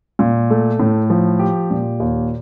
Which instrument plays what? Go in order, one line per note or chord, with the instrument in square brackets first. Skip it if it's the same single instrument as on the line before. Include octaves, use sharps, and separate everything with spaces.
[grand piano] A#2
A3
A2
F3
G4
A#2
D#2